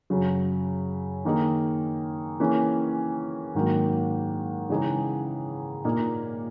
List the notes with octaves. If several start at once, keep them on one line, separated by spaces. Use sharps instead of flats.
F#2 C#3 F#3
D#3 A#3 D#4 G#4
E3 A#3 C#4 G#4
G#2 D#3 F#3 A#3
C#3 E3 G#3 D#4 G#4
A#2 A#3 D#4